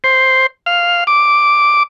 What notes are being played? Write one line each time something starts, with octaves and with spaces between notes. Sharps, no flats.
C5
F5
D6